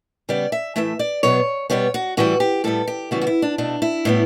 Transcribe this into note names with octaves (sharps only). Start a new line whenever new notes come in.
C#3 G3 B3 D5
E5
A2 E3 A3 E5
D5
B2 F#3 B3 C#5
B2 G3 B3 C#5
F#4
A2 E3 G3 F#4
G4
A2 G3 B3 A4
G4
C#3 E3 G3 B3 F#4
F#4
E4
D4
B2 A3 D4
E4
A2 G3 B3